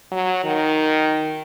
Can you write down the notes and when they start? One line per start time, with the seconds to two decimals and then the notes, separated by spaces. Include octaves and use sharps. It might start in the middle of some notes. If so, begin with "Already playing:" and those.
0.12 F#3
0.44 D#3